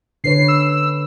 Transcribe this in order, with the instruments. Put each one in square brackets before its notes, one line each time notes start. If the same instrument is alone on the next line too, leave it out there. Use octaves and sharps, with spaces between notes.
[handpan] D3 B4 C#5 [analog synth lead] C7
[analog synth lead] E6